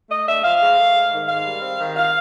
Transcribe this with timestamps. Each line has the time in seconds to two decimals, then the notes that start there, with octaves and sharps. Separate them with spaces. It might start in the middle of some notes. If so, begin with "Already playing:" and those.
0.09 A3 D#5
0.26 D4 E5
0.43 F3 F5
0.61 G#2
0.78 A3
0.95 G#2
1.12 D#3
1.28 G#2 F5
1.45 G3
1.62 C4
1.79 D#3
1.97 F5